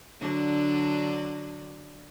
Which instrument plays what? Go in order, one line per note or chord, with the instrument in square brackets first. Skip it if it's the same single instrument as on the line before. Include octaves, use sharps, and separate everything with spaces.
[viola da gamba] D3 F#3 D4